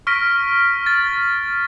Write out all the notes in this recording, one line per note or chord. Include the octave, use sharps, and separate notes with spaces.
C#6 F6 A#6 B6 D7
A6